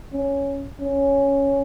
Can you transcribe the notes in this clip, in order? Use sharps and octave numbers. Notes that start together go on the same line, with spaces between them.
C#4
C#4